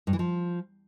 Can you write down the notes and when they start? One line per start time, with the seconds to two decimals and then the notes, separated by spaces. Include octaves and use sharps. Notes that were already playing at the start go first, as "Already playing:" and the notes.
0.07 G2
0.13 E3
0.19 F3